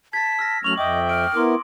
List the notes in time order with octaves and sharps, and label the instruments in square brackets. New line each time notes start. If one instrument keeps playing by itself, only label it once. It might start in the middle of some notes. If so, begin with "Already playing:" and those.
[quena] A5 [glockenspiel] G#6 A6 [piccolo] B6
[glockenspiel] E6 F6 A#6
[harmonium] F#3 A3 C#4 [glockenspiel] C#6 F#7 [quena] F6 [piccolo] F7
[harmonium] F2 E5 [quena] D#5 [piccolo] G5 [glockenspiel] D6 D#6
[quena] F6 [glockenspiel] D7
[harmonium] B3 E4 A#4 [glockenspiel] C6 D6